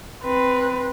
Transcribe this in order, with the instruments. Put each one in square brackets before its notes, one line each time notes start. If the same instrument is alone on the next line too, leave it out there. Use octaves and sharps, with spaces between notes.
[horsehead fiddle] C4 B4